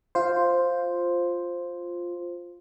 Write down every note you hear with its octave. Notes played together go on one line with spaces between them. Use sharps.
F4 C5